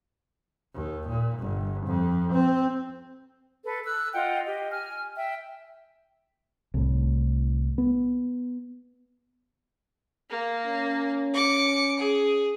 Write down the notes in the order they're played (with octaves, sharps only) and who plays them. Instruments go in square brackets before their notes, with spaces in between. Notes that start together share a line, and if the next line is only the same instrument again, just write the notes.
[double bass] D#2
A#2
G1
F2
C4
[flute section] A4 B4
E6 F#6
F4 D#5 F#5 G5
G4 D#5
G#5 F6
E5 G5
[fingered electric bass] C2 A2
B3
[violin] A#3
[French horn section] C#4
[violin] D6 C#7
G#4